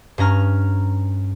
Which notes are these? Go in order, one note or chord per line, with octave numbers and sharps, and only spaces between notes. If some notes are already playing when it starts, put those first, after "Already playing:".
G2 C#4 A#5 F6